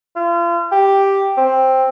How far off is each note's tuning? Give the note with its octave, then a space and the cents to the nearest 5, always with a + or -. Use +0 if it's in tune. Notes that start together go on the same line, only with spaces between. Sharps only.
F4 -35
G4 +0
C4 +5